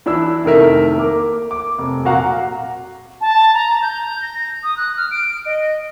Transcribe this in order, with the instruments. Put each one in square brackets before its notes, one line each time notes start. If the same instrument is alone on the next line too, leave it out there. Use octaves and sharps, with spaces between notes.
[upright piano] E3 D4 E4 E6
F1 D#3 A3 A#4 E5
A#3 D6
D6
F1
F1 A#2 F#4 F5 F#5 A#5
[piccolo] A5
A#5
G6
A#6
D#6
F#6
F6
D7
D#5